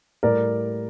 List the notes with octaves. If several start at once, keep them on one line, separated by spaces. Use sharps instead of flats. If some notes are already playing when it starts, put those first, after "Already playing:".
A2 G3 A#4 D5